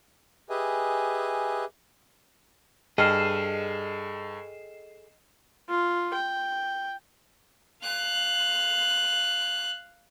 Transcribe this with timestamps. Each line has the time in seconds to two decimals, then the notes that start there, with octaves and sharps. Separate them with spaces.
0.50 G4 G#4 B4 D#5 E5 G#5
2.98 G2 G#4 A4 D#5 G5 F6 C7 E7
5.69 F4
6.14 G5
7.83 F5 F#6